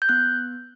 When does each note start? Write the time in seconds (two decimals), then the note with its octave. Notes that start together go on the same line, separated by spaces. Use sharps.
0.02 G6
0.09 B3 F#6